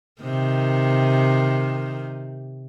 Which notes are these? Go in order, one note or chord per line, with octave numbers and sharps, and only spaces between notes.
C3 D#3